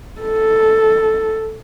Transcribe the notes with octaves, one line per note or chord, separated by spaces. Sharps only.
A4